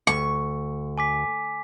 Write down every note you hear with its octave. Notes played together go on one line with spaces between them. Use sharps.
D2 C#6
G#5 D6 B6